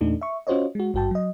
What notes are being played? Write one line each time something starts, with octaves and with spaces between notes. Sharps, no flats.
E2 A#2 A3 D4 D#4
E5 C#6
C#4 F4 F#4 C5 C#5 D#5
G#3 F#4
G#1 G2 F#4 G5 A5
F#3 D#5